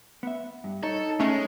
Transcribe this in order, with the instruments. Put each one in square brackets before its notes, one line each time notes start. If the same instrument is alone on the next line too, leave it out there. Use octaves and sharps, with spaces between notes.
[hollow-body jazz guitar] B3 E5
G2
[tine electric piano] D#4 [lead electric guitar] A4 [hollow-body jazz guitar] C#5
[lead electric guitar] G#3 [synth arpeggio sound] A3 C#4